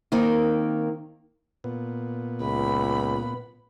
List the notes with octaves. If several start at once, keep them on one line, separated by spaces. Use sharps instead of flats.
D#3 A#3 C4 D#4
A#2 B3
C#2 B5